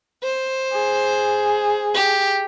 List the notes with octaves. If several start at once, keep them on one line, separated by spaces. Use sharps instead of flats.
C5
G#4
G4